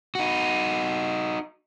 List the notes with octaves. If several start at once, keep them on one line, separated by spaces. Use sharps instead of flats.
D#4 F#4